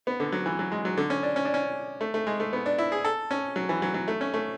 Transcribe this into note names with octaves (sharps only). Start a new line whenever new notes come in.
B3
D3
F#3
E3
F#3
G#3
F#3
D3
C#4
D4
C#4
D4
C#4
A3
A3
G#3
A3
B3
D4
E4
G#4
A4
C#4
F#3
E3
F#3
F#3
A3
C#4
A3